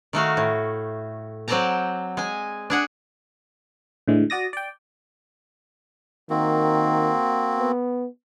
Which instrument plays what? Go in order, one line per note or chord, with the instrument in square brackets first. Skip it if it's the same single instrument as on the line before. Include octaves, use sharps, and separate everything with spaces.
[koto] D#3 A3 F#4 F5
A2
F#3 C4 D5 G5 A5 A#5
G#3 G#5
D4 G#4 F#5
[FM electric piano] A2 D3 E3 G#3
F#4 D5 D#6 A#6
D5 G5
[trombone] D#3 [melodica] A#3 C4 F#4
[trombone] B3